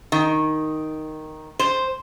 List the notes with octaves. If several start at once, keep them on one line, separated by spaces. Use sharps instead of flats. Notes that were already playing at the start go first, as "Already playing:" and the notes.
D#3
C5